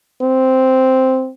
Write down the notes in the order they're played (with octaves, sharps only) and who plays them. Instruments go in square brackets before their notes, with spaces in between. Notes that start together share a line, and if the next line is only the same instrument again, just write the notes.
[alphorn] C4